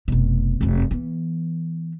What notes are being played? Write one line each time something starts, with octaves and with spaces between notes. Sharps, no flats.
F1 B2
F1 F#2
E3 B3